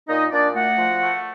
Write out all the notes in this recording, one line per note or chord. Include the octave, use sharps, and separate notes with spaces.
A#2 D#4 D#5
A#2 D4 D5
A3 F#4 F#5
F3
A3